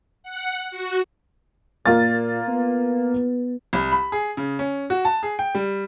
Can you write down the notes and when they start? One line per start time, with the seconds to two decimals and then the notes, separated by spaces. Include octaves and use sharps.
0.23 F#5
0.71 F#4
1.86 A#2 A#3 F4 A6
2.48 B3
3.73 C2
3.92 B5
4.12 G#4
4.37 C#3
4.59 C#4
4.90 F#4
5.05 A5
5.23 G#4
5.39 G5
5.55 G3